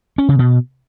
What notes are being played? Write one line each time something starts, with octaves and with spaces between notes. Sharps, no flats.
C#4
C#3
B2